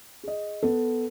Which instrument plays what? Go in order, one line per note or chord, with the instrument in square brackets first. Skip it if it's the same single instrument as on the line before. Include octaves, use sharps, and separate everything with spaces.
[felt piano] G#4 D#5
B3 A4